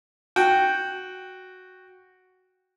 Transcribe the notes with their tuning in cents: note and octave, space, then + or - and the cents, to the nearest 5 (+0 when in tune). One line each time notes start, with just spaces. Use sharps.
F#4 +0 G5 +0